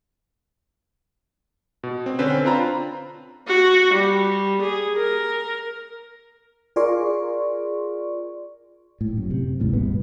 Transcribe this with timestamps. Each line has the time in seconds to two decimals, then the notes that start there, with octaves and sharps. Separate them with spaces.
1.83 B2
2.06 C4
2.19 D3 C4 C#4 B4 C5
2.45 C4 D4 F4 A#5 B5
3.47 F#4
3.93 G3
4.61 G#4
4.96 A#4
6.76 F4 G#4 A#4 D5 C6 C#6
9.01 A2
9.17 F#2
9.30 C3
9.60 G#1 D#2 A2 C#3
9.73 C2 G2 B2 B3